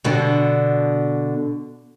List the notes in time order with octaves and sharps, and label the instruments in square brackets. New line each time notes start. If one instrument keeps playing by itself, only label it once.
[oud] B2 D3